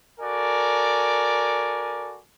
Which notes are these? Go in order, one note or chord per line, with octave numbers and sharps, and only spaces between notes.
F#4 A4 A#4 D5 G#5